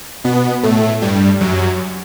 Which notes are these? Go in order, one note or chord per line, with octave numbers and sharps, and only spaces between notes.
B2 B3
A2 A3
G2 G3
F#2 F#3